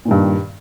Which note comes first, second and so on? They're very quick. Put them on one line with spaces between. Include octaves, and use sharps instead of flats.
A#2 D#3 G2